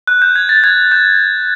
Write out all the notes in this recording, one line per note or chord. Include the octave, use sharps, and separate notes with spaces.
F#6
G6
G#6
A6
G#6
G6